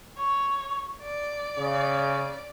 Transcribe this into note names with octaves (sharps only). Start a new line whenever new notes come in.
C#5
D5
C#3